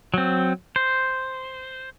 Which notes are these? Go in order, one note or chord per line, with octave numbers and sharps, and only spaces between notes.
F#3 C4
C5